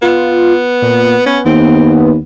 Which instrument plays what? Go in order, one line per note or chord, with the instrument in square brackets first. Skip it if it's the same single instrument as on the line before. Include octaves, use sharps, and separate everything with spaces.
[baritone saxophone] B3 [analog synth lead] F4
[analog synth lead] A#2
[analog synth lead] B3 [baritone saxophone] C#4
[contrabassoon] D#2 [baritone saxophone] C4